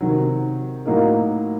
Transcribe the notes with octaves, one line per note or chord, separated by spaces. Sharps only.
C3 D#3 F#3
A2 F#3 A#3 D#4 A#4